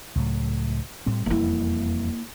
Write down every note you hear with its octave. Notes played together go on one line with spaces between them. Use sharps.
C#2 A2 F#3
A2 G3 C4
E1 F2 G3 A#3 E4